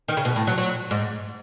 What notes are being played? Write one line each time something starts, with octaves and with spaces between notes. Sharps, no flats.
D#3
C#3
B2
A2
F#3
F#3
G#2